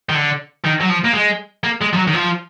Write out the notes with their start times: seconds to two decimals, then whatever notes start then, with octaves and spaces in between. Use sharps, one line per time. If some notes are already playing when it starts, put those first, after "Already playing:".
0.09 D#3
0.15 D3
0.65 D#3
0.81 F#3
0.90 F3
1.05 A#3
1.15 G#3
1.64 A#3
1.81 G#3
1.93 F3
1.97 F#3
2.07 D#3
2.14 F3